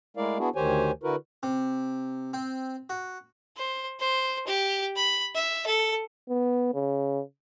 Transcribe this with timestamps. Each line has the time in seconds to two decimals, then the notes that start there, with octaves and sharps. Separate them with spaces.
0.17 G#3 A3 E4 A#4 D5 F5
0.38 B3 D4 E4 F#4 G#4
0.56 D2 D#3 G4 C5 C#5 G#5
1.03 D3 E4 F#4 A#4 B4
1.43 C3
2.33 C4
2.90 F#4
3.57 C5
4.00 C5
4.47 G4
4.96 B5
5.35 E5
5.66 A4
6.29 B3
6.74 C#3